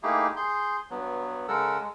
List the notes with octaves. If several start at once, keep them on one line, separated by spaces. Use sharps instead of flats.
A3 A#3 D#4 E4 G4 G#4
G#4 C6 G6
G2 F#3 B3
C#3 G#3 A4 A#4 F#5 E6
G#3